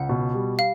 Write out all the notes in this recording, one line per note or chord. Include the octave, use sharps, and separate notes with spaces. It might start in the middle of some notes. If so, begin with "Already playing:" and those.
Already playing: C#2 F#5
B2
G3
F5